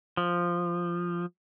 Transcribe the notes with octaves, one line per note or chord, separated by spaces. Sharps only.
F3